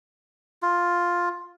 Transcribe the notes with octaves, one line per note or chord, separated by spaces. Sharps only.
F4